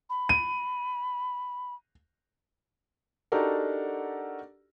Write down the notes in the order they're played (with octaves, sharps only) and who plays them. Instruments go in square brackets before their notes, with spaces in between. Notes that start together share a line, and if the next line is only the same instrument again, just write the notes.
[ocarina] B5
[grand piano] D#7
[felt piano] D4 D#4 F#4 G4 A4 A#4